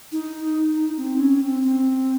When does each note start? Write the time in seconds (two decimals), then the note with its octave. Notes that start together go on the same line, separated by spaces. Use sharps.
0.12 D#4
0.97 C4
1.19 C#4
1.40 C4
1.62 C4